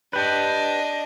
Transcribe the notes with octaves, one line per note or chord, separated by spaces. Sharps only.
D4 G4 B4 D#5